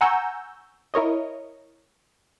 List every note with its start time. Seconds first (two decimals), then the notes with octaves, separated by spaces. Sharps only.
0.01 F#5 G#5 A#5 C#6 E6 G6
0.94 E4 A#4 C#5 D#5